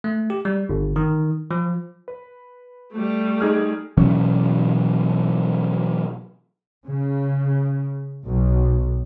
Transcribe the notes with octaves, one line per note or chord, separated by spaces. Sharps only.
A3
G4
G3
G1
D#3
F3
B4
G3 A3
D#4 G#4 F6
B2 E3 F#3 C#4
C#3
B1